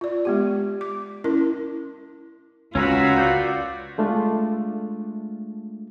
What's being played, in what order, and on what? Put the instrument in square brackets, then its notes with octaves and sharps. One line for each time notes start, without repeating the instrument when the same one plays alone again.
[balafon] F4 D5
G#3 B3 G4
D6
C#4 E4 A#4
[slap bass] C#2 [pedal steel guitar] C#4 A#4 B4 [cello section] F4 F#4 [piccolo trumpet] E6
[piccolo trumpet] D5 [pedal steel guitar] G6
[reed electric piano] G#3 A3 D4 F4